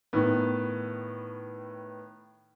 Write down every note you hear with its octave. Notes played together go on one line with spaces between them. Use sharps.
A2 D#3 B3